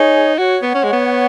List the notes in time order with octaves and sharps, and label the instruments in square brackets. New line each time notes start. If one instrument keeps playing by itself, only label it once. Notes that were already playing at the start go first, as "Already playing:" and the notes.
Already playing: [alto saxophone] D#4 [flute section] G#4 C#5
[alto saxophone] F#4 [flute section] C#5 F#5
[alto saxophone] B3
C#4
G#3
B3